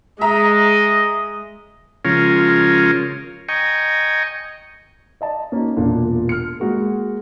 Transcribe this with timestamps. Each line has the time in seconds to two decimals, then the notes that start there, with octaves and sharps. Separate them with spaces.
0.21 G#3 D#5 E5 A#5
2.05 C#3 F3 G#3 C#4 F4 A#4
3.48 D#5 G5 G#5 A#5 C#6
5.21 D5 D#5 A5
5.52 A#3 C#4 D#4 F#4
5.76 E1 A#2 D4 F4
6.29 F6 C#7
6.60 G#3 A#3 F#4 G#4 A#4